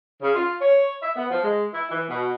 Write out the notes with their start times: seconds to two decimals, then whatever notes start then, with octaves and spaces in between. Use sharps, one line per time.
0.22 C#3
0.35 F4
0.61 C#5
1.02 E5
1.16 B3
1.31 F3
1.42 G#3
1.73 E4
1.91 E3
2.09 B2